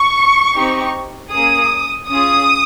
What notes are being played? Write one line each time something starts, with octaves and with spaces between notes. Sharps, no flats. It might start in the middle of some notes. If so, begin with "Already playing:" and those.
Already playing: C#6
C4 D#4 G4
A#3 C#4 G#4 D#6
C#4 F4 G#4 D#6